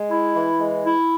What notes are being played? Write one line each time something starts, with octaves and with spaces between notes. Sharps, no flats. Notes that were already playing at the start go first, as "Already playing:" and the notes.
Already playing: G#3
E4
E3
G#3
E4